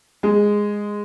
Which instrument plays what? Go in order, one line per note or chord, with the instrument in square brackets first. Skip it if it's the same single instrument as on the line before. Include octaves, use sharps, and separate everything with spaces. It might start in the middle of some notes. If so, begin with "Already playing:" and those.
[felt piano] G#3